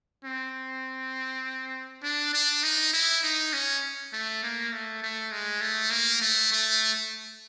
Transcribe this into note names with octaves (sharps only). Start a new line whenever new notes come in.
C4
D4
D4
D#4
E4
D#4
C#4
A3
A#3
A3
A3
G#3
A3
A#3
A3
A3